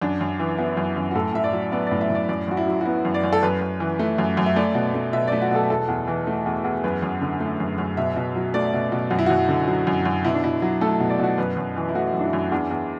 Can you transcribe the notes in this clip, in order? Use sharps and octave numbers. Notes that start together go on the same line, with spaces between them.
F#2 D4
F#2
E3
B3 E4
F#2
F#2
F#4
A2 A4
A2 E5
D5
F#3
B3 D5
D5
A2
E5
A2 D5
F#2 D5
F#2 F#4
E4
F#3
F#4
B3 E4
F#2
D5
F#2
A4
F#2 B4
F#2
E3
A3
F#2
F#2
E5
A3 D5
B2
A3
B2 E5
D5
A3
F#4
B2 A4
E2 A4
E2
E3
A3
E2
E2
F#2 B4
F#2
D3
A3
F#2
F#2
B2 E5
B2
F#3
A3 D5
B2
B2
F#2 F#4
E4
F#2 F#4
D3
F#3
F#2
F#2
B2 E4
D4
B2 E4
F#3
A3 A4
B2
D5
B2 F#4
F#2 B4
F#2
E3
E4
A3 F#4
F#2
D4
E4
F#2
E2 D4
E2